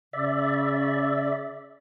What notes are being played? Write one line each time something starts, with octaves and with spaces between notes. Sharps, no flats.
C#3 D5 E5